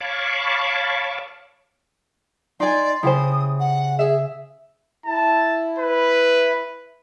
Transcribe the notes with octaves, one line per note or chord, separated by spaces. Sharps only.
C#5 F5 A5 B5 C#6 D6
D#4 D5 G#5 C6
C#3 E4 G4 C5 D#6
F#5
G#4 E5
E4 A5
B4